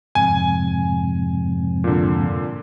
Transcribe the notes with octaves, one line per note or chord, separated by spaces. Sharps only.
F2 G#2 C3 G#5
A#2 D3